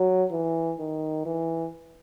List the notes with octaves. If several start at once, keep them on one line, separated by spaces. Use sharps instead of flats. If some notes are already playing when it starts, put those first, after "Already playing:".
Already playing: F#3
E3
D#3
E3